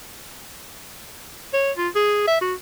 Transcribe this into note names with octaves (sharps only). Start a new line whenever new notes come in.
C#5
F4
G#4
E5
F#4